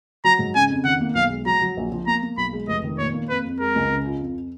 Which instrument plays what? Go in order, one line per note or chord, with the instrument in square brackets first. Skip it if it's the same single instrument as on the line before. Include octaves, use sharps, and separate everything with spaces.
[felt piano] F#3 [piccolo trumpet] A#5
[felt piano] G#2
[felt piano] C#3 [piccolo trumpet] G#5
[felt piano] F2
[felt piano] D#3 [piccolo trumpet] F#5
[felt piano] A#3
[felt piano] B1 [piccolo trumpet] F5
[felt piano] G#3
[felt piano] F#3 [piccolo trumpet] A#5
[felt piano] F#3
A#1
F3
[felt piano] A#3 [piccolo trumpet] A#5
[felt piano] A#3
[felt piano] B1 [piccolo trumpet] B5
[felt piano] G#3
[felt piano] F1 [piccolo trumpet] D#5
[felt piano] D#3
[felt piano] A#2 [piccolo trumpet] C#5
[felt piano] A#3
[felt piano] F2 [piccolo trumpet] B4
[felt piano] F2
[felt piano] G#3 [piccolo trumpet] A#4
[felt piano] C#2
C#3
F4
F2